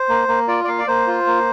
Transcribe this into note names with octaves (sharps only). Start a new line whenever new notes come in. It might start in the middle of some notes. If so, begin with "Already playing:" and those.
Already playing: C5
A#3
A#3
F4 D5
D5
A#3 F5
D5
A#3 C5
F4
A#3